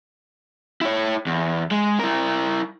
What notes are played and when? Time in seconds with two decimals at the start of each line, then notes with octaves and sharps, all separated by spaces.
0.81 E4 C#5
1.26 E2
1.71 G#3
2.00 E4 A#4